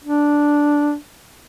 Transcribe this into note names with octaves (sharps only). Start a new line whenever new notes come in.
D4